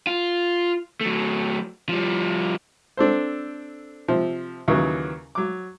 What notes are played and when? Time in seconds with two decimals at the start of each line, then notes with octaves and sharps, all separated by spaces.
0.07 F4
1.01 F#3 A3
1.89 F3 G3
2.97 C4 D4 A4 C5
4.08 C3 F3
4.68 D#2 C#3 E3 F#3
5.35 F#3 D6